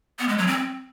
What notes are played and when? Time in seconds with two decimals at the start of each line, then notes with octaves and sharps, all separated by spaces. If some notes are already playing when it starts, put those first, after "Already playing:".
0.19 B3
0.29 G#3
0.38 F#3
0.47 C4